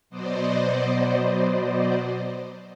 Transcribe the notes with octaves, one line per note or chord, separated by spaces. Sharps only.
B2 F#3 B3 C5 D5 D#5